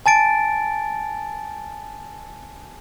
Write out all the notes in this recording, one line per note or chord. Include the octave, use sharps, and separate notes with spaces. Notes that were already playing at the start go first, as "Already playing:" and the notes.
G#5 A5 A6 D7